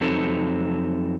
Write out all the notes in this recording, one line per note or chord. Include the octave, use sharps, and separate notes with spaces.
F2 F#3 C4 D#4 A4